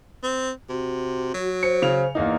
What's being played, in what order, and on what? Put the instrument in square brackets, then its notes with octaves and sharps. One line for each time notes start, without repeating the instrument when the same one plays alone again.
[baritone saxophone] C4
[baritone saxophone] C3 [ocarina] F#4
[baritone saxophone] F#3
[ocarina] C5 [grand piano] C#7
[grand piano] C#3 F7
E2 A#3 D#4